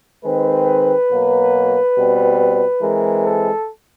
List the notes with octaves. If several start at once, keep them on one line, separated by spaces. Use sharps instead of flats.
D#3 G#3 C4 B4
B2 F#3 A#3
B2 G3 C4
E3 G#3 C4 A#4
A4